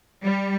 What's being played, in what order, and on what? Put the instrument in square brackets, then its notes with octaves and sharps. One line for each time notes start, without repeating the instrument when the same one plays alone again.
[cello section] G3